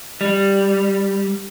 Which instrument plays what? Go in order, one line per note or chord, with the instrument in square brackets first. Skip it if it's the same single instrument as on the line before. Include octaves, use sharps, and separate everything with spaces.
[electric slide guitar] G3